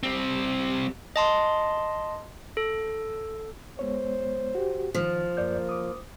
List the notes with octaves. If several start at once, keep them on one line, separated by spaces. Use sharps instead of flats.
G3 C4
D#5 A5 C6
A4
G#3 B3 C5 C#5
F#4 G4
D#3 F3
F#2 A#3 D5 G6
D6 D#6